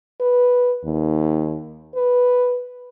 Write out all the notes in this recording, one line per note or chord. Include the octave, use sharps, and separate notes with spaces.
B4
D#2
B4